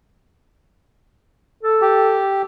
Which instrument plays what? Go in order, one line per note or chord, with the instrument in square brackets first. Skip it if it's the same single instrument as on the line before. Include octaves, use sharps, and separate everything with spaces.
[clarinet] A4
[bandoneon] G4